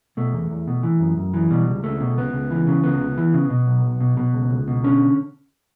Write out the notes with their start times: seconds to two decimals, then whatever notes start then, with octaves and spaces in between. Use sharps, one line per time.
0.17 B2 A3
0.33 E2
0.51 E2
0.67 B2
0.83 E3
1.00 F#2
1.17 F#2
1.34 E3
1.50 B2 G3
1.68 C#2
1.84 C#2 A3
2.01 B2
2.18 C#2 B3
2.33 C#2
2.51 E3
2.67 C#3
2.83 C#2 B3
3.00 C#2
3.18 E3
3.34 C#3
3.50 B2
3.66 B1
3.84 B1
4.00 B2
4.17 B2
4.33 C#2
4.50 C#2
4.68 B2
4.84 D3 C#4